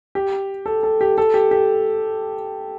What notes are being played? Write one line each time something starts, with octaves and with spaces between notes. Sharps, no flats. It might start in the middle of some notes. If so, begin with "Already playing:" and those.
G4
A4
A4
G4
A4
G4
G4